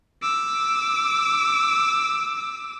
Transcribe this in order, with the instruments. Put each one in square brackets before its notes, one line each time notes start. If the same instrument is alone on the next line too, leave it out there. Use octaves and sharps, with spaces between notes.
[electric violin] D6 E6